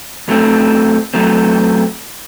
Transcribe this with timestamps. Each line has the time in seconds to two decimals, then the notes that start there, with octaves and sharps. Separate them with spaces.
0.28 F#2 F#3 A3 C4
1.14 F#2 F#3 A3 C4